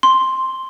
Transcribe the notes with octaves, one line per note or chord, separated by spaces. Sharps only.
C6